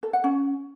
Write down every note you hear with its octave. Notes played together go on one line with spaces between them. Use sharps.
A4
F#5
C#4